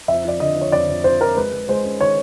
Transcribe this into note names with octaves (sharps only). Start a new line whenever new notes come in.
F2 E5
F3 D5
D3 D#5
F3
C#5
F2 D5
F2
F2 C5
F2 A#4
G#3 B4
G#3
G#3 C5
C#4
D#3 C#5